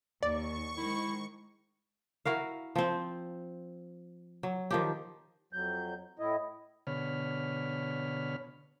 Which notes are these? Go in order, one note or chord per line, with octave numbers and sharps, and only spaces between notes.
D#2 D5 C#6
D#3 G#3 E4 C5
E4 F#4 A#4 F5
F3 C4
F#3
D#3 F3 G4
F2 F#3 G6
A2 E4 D#5
B2 D3 C#5 B5 F6